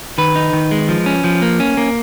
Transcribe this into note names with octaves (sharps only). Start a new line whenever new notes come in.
D#3 B4
D#4
D#3
G#3
F3
C#4
F3
A#3
C#4
A#3